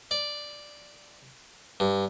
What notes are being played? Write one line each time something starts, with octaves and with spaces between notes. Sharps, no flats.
D5
G2